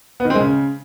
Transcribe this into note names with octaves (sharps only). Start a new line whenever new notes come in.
B3
D#3
C4
G#3
C#3